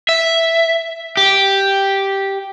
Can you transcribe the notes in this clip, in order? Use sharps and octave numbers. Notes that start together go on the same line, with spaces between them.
E5
G4